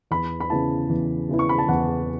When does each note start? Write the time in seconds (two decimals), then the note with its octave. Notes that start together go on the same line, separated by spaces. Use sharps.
0.11 E2 B5
0.40 B5
0.50 C#3 E3 B3 E4 A5
0.89 E2
1.29 C#3 E3 B3 E4
1.39 C#6
1.49 B5
1.58 A5
1.68 E2 F#5